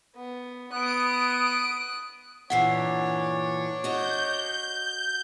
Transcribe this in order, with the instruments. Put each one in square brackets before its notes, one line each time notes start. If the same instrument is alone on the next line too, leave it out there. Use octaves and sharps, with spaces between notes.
[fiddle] B3
[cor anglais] B3 [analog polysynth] D#6 D7 [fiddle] F#6
[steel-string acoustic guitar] G2 A#2 E3 [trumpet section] D4 C#5 [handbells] F#5 C7
[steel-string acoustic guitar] F#4 D#5 [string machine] G6